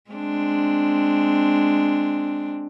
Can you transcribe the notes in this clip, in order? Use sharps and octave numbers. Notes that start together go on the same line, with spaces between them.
G#3 C4 D4